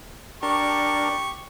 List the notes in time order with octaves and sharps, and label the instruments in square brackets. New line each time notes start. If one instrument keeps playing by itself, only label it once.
[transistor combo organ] D4 A#4 [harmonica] G4 C#6